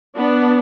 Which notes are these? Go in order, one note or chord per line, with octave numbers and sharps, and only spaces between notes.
B3 D4